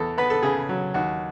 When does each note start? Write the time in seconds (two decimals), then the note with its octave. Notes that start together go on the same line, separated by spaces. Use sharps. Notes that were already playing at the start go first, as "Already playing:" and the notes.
Already playing: E2 A4
0.18 B3 B4
0.30 A4
0.42 C#3 G#4
0.69 F#3
0.94 D#2 F#4